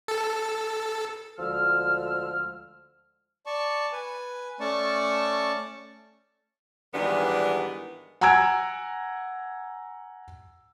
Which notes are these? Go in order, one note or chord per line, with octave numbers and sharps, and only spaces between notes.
A4
D2 D3 F3 G#3 E6 F6
D5 A5 C#6
B4 G#5
A3 C#4 D5 A5 C#6
G#2 D#3 E3 G3 B3 D4
F#5 G#5 A#5 E6 G#6 D7